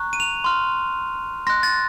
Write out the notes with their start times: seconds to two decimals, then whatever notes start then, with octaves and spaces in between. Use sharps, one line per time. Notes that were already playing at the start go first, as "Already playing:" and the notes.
Already playing: A#5 C#6 F#6
0.13 D#7
0.20 F7
0.44 C6 F6
1.47 C6 F#6 A#6
1.63 A6